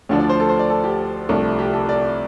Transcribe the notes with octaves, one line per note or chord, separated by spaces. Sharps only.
D2 D3 F3 D4
D5
C5
A4
C5
D5
A4
G4
C2 C3 F3 A3 D4
G4
A4
D5